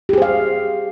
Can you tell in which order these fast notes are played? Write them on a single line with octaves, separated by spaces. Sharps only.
G4 G#4 C5 F5